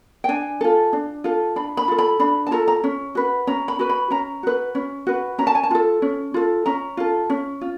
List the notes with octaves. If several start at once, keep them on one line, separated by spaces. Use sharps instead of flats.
G5
D4 G#5
F4 A4
D4
F4 A4
D4 B5
B5
F4 A4
B5
D4 B5
A5
F4 A4 A#5
A#5
C#4
F#4 B4
C#4 A#5
B5
F#4 B4
B5
C#4 A#5
F#4 B4
C#4
F#4 B4
C#4 A#5
A5
G#5
A5
F4 A4
C#4
F4 A4
C#4 A#5
F4 A4
C#4
F4